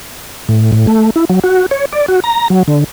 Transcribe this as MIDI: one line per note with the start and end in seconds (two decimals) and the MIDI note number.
0.49 0.72 45
0.72 0.86 45
0.87 1.10 57
1.16 1.25 64
1.29 1.39 54
1.44 1.66 66
1.71 1.85 73
1.93 2.06 74
2.08 2.20 66
2.24 2.48 82
2.50 2.63 54
2.68 2.84 50